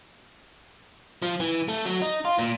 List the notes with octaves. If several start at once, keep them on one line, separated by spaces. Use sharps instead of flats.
F3
E3
A3
F#3
D#4
F4
A#2